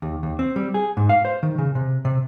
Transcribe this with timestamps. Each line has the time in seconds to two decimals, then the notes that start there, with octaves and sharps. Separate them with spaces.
0.02 D#2
0.23 D#2
0.39 C4
0.56 G3
0.74 G#4
0.97 G#2
1.09 F5
1.25 C5
1.43 D#3
1.58 C#3
1.75 C3
2.05 C3